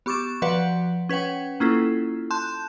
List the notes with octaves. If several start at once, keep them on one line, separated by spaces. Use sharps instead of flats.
B3 G4 C#6 D6 A6 E7
F3 F#4 B4 D5 F#5
C#4 B4 C#5 F#5 G5
A#3 C#4 E4 F4 A4
A5 C6 F#6 G6 E7